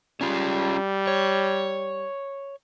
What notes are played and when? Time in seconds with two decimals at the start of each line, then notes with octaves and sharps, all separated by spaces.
0.21 G3 C#4 F4
1.07 C#5